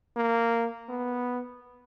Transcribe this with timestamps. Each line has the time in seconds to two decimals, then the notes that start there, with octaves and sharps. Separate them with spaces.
0.16 A#3
0.89 B3